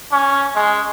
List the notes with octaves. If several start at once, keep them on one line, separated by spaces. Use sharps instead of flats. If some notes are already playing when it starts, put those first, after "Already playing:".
C#4
G#3